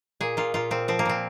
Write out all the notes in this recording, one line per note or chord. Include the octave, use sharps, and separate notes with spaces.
A#2 G#4
A#2 F4
A#2 F4
A#2 C4
F3 C4
A#3
A#2 C4